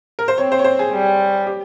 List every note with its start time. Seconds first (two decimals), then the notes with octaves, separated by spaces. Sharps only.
0.19 A#4
0.28 C5
0.38 C4 C#5
0.52 C5
0.59 C#5
0.64 C5
0.79 G#4
0.93 G3
1.47 G4